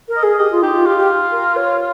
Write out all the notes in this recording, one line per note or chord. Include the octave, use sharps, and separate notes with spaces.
A#4
D#5
G#4
G4 D#5
F4
D#4 G4
F4
F4 G4
G4
A#4
C#5